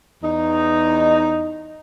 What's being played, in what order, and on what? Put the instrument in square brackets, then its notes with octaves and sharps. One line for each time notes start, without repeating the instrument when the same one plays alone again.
[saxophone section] E2 D#4